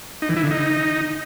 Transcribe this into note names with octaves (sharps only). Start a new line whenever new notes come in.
D#4
E3
E4
D3
D#4